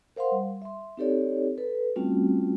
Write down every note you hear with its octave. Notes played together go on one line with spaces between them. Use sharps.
A#4 C5 F5 F#5 C6
G3
E5 C6
C4 D#4 G4 A4 C#5 D5
A4 B4
G3 A3 C4 C#4 F4 F#4